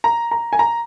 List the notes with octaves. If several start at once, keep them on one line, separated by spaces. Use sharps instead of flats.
A#5
A#5
G#5
A#5